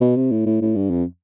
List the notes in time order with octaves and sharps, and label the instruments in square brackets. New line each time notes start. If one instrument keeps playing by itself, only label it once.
[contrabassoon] B2
C3
A2
A2
A2
G2
F2